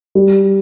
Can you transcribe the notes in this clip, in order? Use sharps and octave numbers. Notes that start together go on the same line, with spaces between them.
G3